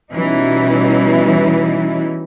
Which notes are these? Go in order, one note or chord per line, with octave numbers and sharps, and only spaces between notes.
B2 E3 G3 C#4 D#4 E4